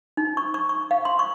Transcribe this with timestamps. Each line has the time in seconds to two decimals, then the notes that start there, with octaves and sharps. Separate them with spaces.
0.17 D#4
0.37 C#6
0.54 C#6
0.69 C#6
0.91 F5
1.05 C6
1.19 C#6